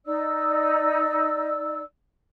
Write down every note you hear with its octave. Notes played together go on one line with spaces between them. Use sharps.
D#4 D5 E6